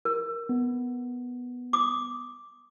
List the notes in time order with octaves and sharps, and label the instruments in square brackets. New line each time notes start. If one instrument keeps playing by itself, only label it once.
[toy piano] A#4
[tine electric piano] B3
[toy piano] D6 D#6